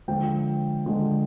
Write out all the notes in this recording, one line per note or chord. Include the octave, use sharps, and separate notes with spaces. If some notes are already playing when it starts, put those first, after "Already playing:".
D3 F3 G#3 G5
D3 F3 G#3